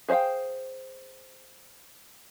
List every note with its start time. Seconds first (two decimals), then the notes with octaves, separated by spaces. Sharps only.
0.09 G#4 C5 D#5 F5 G5